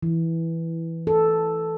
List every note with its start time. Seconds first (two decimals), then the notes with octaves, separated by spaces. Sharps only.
0.03 E3
1.07 A4